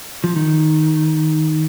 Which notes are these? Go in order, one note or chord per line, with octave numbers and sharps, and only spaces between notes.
F3
D#3